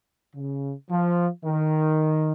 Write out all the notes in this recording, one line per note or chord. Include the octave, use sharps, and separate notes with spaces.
C#3
F3
D#3